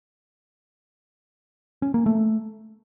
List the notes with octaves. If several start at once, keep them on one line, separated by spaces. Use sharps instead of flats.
C#4
A#3
A3